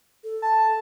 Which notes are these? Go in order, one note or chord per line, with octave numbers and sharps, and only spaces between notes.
A4
A5